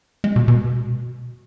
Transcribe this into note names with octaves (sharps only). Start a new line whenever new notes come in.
G#3
B2
B2